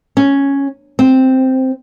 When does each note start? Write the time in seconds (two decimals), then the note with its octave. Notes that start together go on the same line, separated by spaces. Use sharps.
0.17 C#4
0.99 C4